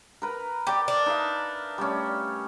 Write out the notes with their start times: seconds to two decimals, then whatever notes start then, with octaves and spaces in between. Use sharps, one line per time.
0.22 A#4 B4 A#5
0.67 G4 D5 D6
0.88 D4
1.06 D#4 E5 F5
1.78 G3 A3 C#4